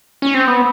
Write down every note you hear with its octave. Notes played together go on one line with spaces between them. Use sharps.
C#4
C4
B3